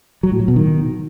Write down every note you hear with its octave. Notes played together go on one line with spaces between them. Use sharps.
F#3
A2
F#3
B2
D#3